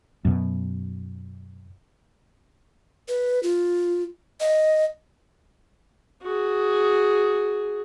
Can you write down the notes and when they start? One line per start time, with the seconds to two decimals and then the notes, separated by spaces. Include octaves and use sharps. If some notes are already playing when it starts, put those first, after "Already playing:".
0.25 F#2 B2
3.08 B4
3.43 F4
4.40 D#5
6.23 F#4 G#4